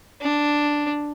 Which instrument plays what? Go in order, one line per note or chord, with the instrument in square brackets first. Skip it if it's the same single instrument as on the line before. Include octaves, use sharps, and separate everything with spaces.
[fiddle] D4